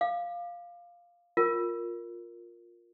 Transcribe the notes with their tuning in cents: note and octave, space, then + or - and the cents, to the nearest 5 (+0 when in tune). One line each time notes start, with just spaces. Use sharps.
F5 +0 D6 +30
F4 +10 A#4 +0